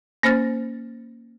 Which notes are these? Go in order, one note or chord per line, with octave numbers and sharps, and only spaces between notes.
A#3 C#4 C5 F6 A6